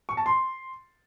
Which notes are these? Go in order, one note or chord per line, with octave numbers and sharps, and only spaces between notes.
C#6
A5
C6